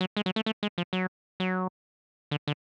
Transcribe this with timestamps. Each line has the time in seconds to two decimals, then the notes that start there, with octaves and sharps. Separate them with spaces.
0.01 F#3
0.17 G#3
0.26 F#3
0.36 A3
0.46 A3
0.63 G#3
0.78 F3
0.93 F#3
1.40 F#3
2.31 D3
2.48 D3